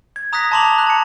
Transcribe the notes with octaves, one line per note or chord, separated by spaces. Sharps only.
G#6
A#5 D#6 F#6 A#6 B6
A5 A#5 C6 D6 F7 F#7
A#5 F#6
A5 C#7